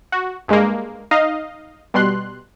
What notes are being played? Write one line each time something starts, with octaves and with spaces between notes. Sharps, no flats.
F#4
G2 G#3 A#3
D#4 D#5 F5
B2 G3 C6 F#6